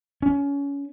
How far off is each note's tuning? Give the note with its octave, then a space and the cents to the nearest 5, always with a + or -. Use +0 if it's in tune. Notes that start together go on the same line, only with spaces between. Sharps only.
C#4 +25